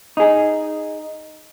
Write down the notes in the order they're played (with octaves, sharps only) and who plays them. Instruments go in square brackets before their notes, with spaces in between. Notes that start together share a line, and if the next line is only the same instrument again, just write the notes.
[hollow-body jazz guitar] D#4 G#4